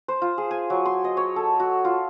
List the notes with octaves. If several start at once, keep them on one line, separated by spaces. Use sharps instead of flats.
C5
F4
G#4
G#5
F#3
C6
D#5
C#5
A4
F#4
F4